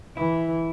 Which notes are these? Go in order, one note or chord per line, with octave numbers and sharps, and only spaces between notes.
E3 E4